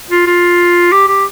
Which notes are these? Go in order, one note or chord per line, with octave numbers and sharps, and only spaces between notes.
F4
F4
G4
G4